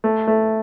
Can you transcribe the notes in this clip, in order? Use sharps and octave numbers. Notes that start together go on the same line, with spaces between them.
A3
A3